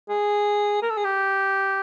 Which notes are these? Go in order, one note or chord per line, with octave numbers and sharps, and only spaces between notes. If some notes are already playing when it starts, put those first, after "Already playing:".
G#4
A#4
A4
G#4
G4